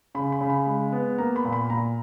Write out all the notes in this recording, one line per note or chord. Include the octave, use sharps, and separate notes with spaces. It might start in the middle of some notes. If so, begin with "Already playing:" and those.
C#3 B5
B5
C#3
B5
G#3
B3
A#3 A#5
B5
A#2
B5
A#2 A#5